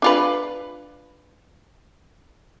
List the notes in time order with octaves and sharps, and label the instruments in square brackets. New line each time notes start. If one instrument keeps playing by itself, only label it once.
[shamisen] D4 F4 B4